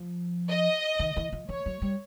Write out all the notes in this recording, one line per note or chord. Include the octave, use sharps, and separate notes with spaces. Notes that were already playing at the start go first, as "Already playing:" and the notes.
Already playing: F3
D#5
D#3
E3
F3
F3 C#5
F#3
G3